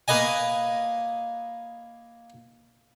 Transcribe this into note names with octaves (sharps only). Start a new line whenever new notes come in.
A#3 B4 D#5 G#5